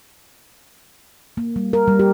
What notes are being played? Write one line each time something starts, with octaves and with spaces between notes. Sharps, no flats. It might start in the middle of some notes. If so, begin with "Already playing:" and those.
A#3
G3
A#4
G3
G4